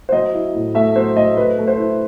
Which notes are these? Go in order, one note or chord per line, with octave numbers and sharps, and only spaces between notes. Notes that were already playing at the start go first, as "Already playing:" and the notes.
C5
F#3 D#5
E4
A2
A3 E5
F#3 C5
A3 D#5
A3 B4
A3
C5
E4